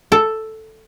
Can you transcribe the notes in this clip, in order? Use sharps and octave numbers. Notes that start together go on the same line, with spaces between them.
A4